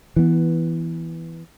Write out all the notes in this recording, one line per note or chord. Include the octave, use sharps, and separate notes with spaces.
E3 B3